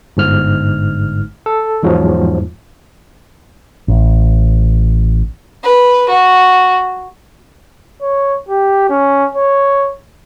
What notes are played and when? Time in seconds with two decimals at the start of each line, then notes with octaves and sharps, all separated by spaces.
0.17 G1 G#2 F6
1.46 A4
1.83 E2 G#2 F3 F#3
3.88 A1
5.64 B4
6.09 F#4
8.02 C#5
8.48 G4
8.90 C#4
9.35 C#5